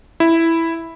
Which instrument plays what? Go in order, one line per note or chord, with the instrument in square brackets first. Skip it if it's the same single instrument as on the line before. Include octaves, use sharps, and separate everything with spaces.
[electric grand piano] E4